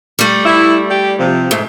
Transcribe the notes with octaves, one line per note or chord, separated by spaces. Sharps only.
G3 A3
E4
G4 D5
C3 F3
G#2 A3